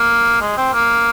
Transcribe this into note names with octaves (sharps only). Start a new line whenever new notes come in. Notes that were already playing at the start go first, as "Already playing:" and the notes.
Already playing: A#3
G#3
C4
A#3